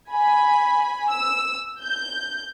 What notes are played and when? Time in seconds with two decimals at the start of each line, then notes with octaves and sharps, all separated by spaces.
0.10 G#5 B5
1.09 E6
1.82 G6